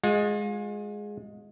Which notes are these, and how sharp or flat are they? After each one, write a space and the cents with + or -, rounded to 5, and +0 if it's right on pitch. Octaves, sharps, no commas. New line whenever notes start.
G#3 +0 F4 +35